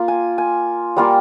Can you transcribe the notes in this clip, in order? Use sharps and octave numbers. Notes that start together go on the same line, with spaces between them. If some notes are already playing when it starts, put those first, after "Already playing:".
Already playing: A#3 F4
G#5
G#5
G3 A#3 F4